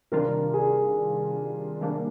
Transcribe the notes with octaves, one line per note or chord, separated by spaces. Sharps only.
C3 D#3 G3 D4 F4 A#4
G#4
C3 D#3 G3 A#3 D4